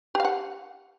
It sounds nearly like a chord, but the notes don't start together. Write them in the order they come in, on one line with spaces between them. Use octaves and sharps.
G4 F5 F#5